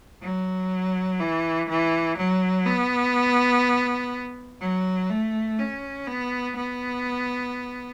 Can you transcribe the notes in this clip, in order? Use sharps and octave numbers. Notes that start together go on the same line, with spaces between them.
F#3
E3
E3
F#3
B3
F#3
A3
C#4
B3
B3